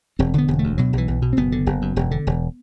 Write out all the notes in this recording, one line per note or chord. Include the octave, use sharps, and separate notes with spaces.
E1 C4
D3 B3
E1
D2 A3
B2 F#3
B1 E3
B1
B2
C4
F#1 B3
D3
F#1
F#2
E1
D3
E1